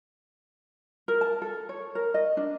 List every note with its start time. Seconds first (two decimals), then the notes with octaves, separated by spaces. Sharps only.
1.08 A#4
1.21 A5
1.42 A4
1.69 C#5
1.95 A#4
2.14 D#5
2.37 D4